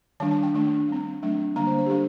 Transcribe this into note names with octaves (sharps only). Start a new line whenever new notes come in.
D#3 G3 D4 A5
A5
G5
D#3 A3 D4
G3 C4
F#3 A3 D4
D3 G3 A#3 D4 A#5
C5
C5
G4
G3 D4 A4